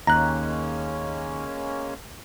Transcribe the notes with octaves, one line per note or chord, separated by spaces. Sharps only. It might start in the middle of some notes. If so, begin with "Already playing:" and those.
D#2 G#3 A#3 C#4 A#5 F#6